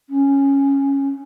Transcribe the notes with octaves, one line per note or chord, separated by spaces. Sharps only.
C#4